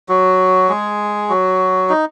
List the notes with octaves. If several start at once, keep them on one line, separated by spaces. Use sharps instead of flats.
F#3 F#4
G#3 G#4
F#3 F#4
D#4